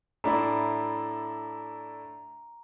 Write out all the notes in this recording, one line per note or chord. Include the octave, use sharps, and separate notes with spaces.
A2 D4 E4 A#5